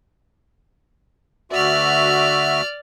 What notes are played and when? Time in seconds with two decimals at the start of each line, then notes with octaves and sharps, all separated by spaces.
1.52 D2 F#4 D5 E5 F6